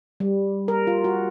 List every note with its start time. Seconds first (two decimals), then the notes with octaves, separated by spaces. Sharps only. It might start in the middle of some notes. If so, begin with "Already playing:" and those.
0.20 G3
0.68 A#4
0.87 F4
1.04 F#4